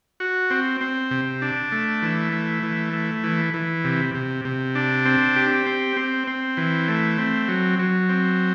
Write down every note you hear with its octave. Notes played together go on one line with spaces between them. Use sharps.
F#4
C4
C4
C3
D4
A3
E3
A3
E3
A3
E3
E3
C3
C3
C3
D4
C4
G4
C4
C4
C4
E3
A3
C4
F#3
F#3
C4